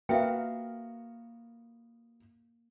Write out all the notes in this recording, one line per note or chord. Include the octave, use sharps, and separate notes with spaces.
A#3 B3 F#4 A#4 E5 F5 G5